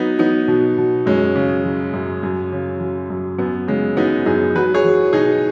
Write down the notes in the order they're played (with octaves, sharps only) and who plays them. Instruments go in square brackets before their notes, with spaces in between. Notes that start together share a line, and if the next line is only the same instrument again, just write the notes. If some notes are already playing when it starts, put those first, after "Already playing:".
Already playing: [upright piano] F#3 B3 D#4
F#3 B3 D#4
B2
B2
F#2 G#3 C#4
C#3
F#3
F#2
F#2
C#3
F#3
F#2
F#2 B3
C#3 G#3
F#3 B3 D#4
F#2 D#4 G#4
F#3 F#4 B4
G#4 C#5
F#3
B2 D#4 G#4